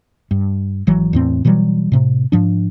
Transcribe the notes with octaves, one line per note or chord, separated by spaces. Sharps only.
G2
G#1 E3 F#3
E2 A2 C4
B2 E3 F#3 G3
A2 C3
G#2 F3 D4